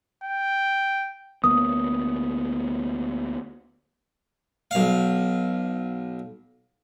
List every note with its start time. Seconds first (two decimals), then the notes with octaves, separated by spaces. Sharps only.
0.24 G5
1.44 D2 A#3 B3 D#6
4.71 B1 F5